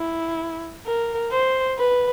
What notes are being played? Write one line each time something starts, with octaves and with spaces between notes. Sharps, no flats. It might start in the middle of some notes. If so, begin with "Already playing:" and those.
Already playing: E4
A#4
C5
B4